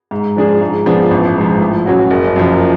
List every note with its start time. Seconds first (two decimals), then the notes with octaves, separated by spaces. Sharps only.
0.11 G#2
0.36 F3 G#3 D4 G#4
0.61 G#2
0.86 F3 B3 D4 G#4
1.11 A1
1.36 G#2 F3
1.61 A2
1.86 F#3 C#4 F#4
2.10 F#1
2.36 F#2 F3